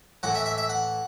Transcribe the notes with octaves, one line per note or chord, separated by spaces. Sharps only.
A2 E3 F#5
E5
E5
E5
F#5